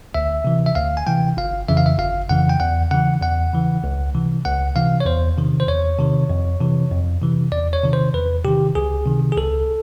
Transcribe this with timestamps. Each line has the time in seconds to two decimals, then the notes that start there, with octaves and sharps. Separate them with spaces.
0.14 D2 E5
0.45 C3 E3
0.66 E5
0.75 D2 F5
0.97 G#5
1.06 C3 E3 G5
1.37 G1 F5
1.68 F2 C#3 E3 E5
1.77 F5
1.86 E5
1.99 G1 F5
2.29 F2 C#3 E3 F#5
2.49 G5
2.60 E2 F#5
2.91 C#3 E3 F#5
3.22 E2 F#5
3.53 C#3 E3
3.84 C#2
4.15 C3 E3
4.45 C#2 F#5
4.76 C3 E3 F5
5.00 C#5
5.06 E2 C5
5.38 C3 D#3
5.60 C5
5.68 E2 C#5
5.99 C3 D#3
6.29 F2
6.61 C3 E3
6.91 F2
7.22 C3 E3
7.52 E2 D5
7.73 C#5
7.84 C3 D#3
7.93 C5
8.14 E2 B4
8.44 C3 D#3 G4
8.75 C#2 G#4
9.06 C3 D#3
9.32 G#4
9.37 C#2 A4